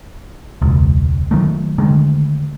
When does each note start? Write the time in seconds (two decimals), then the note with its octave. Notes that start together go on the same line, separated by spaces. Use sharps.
0.62 E1 C#2
1.31 D#3 F#3 A3
1.78 D3 D#3 G#3 A3